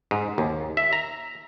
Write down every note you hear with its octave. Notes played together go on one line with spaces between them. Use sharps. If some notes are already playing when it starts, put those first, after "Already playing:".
G#2
D#2
E5
A#5